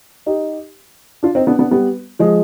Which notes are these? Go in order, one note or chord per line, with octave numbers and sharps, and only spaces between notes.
D#4 G4
D4 F4
C4 D#4
B3 D4
B3 D4
G3 B3
F3 G#3